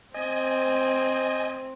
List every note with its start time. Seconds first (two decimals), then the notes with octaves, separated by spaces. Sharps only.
0.14 C4 D#5 G#5